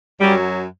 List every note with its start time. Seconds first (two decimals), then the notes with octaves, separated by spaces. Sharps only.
0.21 F#2 F#3 G3